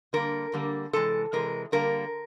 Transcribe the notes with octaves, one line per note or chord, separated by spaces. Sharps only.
D3 G3 A#3 A#4
D3 G3 A#3
C3 E3 G#3 A4
C3 E3 G#3 A#4
D3 G3 A#3 A#4